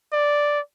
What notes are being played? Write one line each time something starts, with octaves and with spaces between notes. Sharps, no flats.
D5